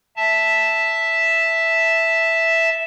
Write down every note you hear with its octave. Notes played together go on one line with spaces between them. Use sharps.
E5 A5